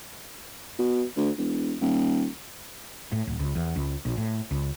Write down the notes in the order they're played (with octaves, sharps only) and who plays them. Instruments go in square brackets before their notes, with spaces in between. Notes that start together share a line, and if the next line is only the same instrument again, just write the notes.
[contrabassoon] B2
D2
E1
D#1
[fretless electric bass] A2
D1
C#2
E2
C#2
A#1
A2
C#2